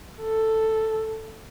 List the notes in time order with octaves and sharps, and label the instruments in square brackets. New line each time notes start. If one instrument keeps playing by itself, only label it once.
[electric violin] A4